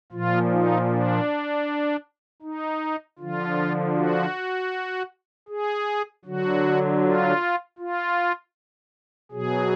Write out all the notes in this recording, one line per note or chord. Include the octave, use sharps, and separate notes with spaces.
A#2 F3 F4
D#4
D4
D#4
D3 F3 F4
F#4
G#4
D3 F#3 F#4
F4
F4
B2 F#3 G#4